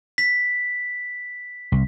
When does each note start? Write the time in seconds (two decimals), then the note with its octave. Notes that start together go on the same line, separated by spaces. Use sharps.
0.18 B6
1.72 C2